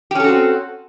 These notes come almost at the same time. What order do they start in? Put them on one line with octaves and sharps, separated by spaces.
G4 C#4 A4 F#4 C4